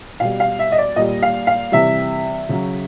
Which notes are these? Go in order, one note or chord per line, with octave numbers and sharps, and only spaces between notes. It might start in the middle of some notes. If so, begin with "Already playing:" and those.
B2 G3 F5
F5
E5
D#5
D5
A#2 G3 D#5
F5
F5
C3 E3 G3 E5
C#3 F#3